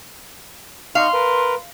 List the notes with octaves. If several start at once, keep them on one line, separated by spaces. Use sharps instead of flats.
D#4 F5 C6 C#6
A#4 B4